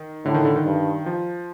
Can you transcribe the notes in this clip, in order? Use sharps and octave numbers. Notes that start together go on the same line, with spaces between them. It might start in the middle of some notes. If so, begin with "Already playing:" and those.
Already playing: D#3
A2 D3
D#3
D3
D#3
G2
F3